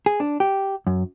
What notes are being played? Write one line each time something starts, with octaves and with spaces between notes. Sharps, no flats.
G#4
D4
G4
F#2